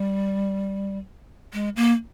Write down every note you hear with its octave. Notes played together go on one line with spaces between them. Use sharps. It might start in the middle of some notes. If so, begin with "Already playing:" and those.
Already playing: G3
G#3
A#3